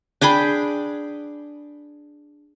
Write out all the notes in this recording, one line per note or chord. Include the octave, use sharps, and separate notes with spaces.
D4 G#4 G5 B5